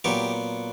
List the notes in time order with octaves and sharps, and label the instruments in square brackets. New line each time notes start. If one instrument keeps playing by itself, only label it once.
[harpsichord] A#2 F#3 B3 G4